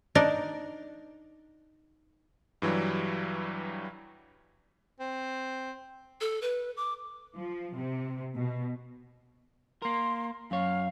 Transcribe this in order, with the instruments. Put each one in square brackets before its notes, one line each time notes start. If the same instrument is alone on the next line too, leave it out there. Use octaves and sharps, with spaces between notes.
[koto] D4 D#4 A#4
[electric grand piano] G2 E3 F#3 G3
[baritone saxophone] C4
[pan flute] A4
B4
D6
[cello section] F3
C3
B2
[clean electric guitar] A#3 A#4 [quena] C6
[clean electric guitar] F#2 C#5 [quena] F5